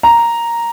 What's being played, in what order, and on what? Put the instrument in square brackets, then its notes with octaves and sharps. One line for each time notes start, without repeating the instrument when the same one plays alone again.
[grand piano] A#5